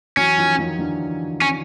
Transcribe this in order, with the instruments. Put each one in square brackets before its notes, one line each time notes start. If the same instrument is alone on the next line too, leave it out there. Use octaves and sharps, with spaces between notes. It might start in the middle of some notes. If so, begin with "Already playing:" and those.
[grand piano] E3 F#3 [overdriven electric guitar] C#4
[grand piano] D#3 F3
D#3 F3
D3 E3
[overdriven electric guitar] C#4